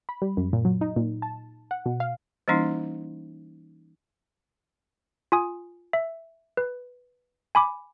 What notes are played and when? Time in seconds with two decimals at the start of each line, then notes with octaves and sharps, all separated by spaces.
0.09 B5
0.22 G3
0.37 F#2
0.53 A#2
0.65 F#3
0.81 D#4
0.96 A#2
1.22 A5
1.71 F#5
1.86 B2
2.00 F5
2.48 E3 G3 A#3 C#4 D#4 E4
5.32 F4 G#5 D#6
5.93 E5
6.57 B4
7.55 G#5 B5 D6